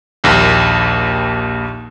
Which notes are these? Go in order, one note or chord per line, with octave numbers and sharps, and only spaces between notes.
A#1 D#2